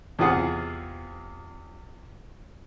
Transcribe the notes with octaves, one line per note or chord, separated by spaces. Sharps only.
E2 C3 F4 G#4 F#5